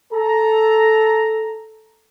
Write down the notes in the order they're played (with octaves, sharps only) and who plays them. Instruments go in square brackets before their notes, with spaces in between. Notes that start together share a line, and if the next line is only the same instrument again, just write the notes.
[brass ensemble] A4 A#5